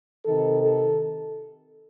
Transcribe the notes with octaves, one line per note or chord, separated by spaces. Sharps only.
C3 D#3 A4
A4